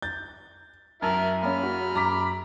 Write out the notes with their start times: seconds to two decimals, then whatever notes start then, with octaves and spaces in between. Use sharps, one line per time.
0.02 G6 A6
1.02 F#2 E4 A#4 A5 F6
1.43 A#3 C#4 B5 F6
1.63 F#4
1.95 F#2 A#5 D6 B6